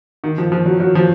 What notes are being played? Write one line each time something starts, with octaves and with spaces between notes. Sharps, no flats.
D#3
F3
F3
F#3
F#3
F3